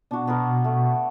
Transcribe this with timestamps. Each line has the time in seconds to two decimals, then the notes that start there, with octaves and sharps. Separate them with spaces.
0.11 B2 D4 F#4
0.27 B3 F#4 A#4
0.64 A3